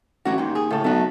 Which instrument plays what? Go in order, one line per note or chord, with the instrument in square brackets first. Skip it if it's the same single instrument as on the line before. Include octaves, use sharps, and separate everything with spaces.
[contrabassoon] A1 [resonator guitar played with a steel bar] F#3 E4 F#4
[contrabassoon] D#2 [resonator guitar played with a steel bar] G#2 G5
[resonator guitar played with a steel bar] G#4
[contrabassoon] A2 [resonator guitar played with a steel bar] C#3 A4
[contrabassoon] B1 [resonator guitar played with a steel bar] A3 F#4